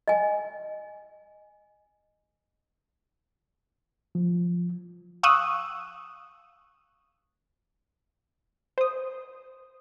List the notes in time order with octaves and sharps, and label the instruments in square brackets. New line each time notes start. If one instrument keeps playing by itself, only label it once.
[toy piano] D#5 G#5
[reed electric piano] F3
[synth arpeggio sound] F5 C#6 D#6 E6 F#6
C5 D#6